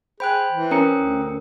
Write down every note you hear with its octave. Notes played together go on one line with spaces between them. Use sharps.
G#4 C5 G5 B5 F#6
E3
C#4 A#4 A#5 D#6 C#7
D2